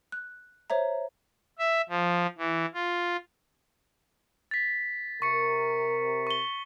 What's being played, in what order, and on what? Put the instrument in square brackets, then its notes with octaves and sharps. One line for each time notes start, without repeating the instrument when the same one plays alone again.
[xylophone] F#6
C5 C#5 E5 A#5
[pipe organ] E5
F3
E3
F4
[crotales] A6 B6
[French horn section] C3 A#4 [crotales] C#6 C#7
[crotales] C#6 G7